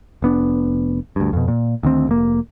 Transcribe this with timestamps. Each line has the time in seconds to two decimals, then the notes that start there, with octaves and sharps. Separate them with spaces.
0.22 F1 B3 D4
1.16 D2 G2
1.33 F2 B2
1.48 A#2
1.83 D2 D#3 C4
2.07 F1 A#3